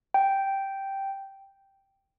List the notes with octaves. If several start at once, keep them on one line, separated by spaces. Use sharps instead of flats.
G5